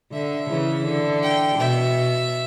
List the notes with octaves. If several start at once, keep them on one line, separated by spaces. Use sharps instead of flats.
D3 E5
C#3 E3
D3
G5
B2 E5